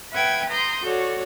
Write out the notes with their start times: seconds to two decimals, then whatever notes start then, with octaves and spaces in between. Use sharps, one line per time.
0.13 B4 E5 F#5 G5 G#6
0.49 A#5 C6 D#6 G6
0.82 F#4 A4 C#5 D5